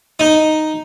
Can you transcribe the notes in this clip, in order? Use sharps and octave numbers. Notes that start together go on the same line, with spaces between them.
D#4